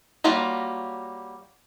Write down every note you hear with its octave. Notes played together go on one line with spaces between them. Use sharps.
F#3 G3 A#3 F4